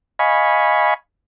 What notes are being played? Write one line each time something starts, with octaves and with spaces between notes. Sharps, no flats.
D#5 F5 G#5 B5 C#6